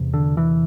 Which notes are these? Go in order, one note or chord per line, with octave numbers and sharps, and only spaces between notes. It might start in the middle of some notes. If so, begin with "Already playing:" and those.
Already playing: E2 C3
D3
E3